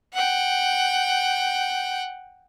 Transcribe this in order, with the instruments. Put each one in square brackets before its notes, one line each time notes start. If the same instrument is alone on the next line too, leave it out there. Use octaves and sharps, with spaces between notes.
[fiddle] F#5 G5